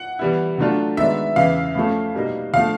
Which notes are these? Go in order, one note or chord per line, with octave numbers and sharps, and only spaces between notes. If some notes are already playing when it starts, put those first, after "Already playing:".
Already playing: F#5
E3 G3 B3 E4
D3 F#3 A3 D4 F4
D#3 G#3 B3 D4 F#4 E5
E2 C#3 E3 F5
A2 F3 A3 C#4
B2 G3 A#3 D#4
D3 F3 A3 F5